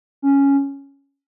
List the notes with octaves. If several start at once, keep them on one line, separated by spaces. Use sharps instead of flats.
C#4